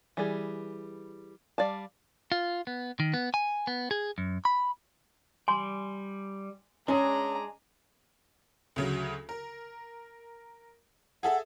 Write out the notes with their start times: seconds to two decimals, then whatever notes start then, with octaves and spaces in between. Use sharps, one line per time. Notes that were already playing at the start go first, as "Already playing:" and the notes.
0.17 E3 G3 G#4
1.58 G3 D5 F5 A5
2.32 F4
2.67 B3
3.00 D#3
3.14 B3
3.34 G#5
3.67 B3
3.91 G#4
4.18 F#2
4.45 B5
5.48 G3 G#5 C6
6.88 G#3 C#4 D4 G#4 A#5
8.76 D2 C#3 F#3
9.29 A#4
11.23 G#4 A4 E5 F#5